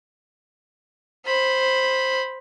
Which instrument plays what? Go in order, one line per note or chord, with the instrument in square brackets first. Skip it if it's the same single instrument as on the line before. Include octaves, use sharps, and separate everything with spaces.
[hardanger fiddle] C5 B5